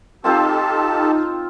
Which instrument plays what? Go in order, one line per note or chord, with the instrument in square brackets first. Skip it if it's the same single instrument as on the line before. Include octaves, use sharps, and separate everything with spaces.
[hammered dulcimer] C4 F4 C5 [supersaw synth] D#4 [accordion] G4 A4 A5